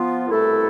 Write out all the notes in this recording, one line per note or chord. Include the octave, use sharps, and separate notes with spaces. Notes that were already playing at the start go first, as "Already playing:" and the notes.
Already playing: F3 B3 F4
C2 B2 A3 E4 A4